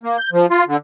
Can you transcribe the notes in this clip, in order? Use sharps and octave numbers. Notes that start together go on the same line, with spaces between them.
A#3
G6
F3
F4
D3